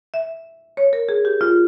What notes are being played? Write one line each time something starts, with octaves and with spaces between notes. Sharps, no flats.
E5
C#5
A#4
G#4
G4
F4